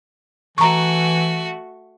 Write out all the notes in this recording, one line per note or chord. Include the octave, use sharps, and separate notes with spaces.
E3 A3 F#4 A#5 C#6